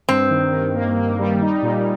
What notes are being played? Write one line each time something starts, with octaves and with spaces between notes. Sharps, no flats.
G2 C4
D#3
D#3
A#3
A#3
G3
D#4
A#2